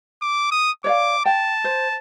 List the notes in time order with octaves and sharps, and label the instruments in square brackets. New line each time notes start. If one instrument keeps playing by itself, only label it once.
[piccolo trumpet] D6
D#6
[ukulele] C#5 D5 F5 [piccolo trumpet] D6
[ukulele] G5 [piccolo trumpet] A5
[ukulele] C5